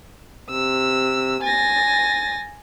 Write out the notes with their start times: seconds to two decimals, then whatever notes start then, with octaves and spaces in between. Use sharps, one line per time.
0.50 C3 E6
1.43 G#5 A6 A#6